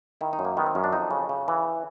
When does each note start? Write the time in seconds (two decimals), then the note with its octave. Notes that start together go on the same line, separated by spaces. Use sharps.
0.21 D#3 E4
0.33 D#4
0.39 F#2
0.45 A#3
0.57 D#3 B3
0.66 C4
0.75 F#2 C#4
0.84 D4
0.93 F2 D#4
1.11 C#3
1.29 C#3
1.48 E3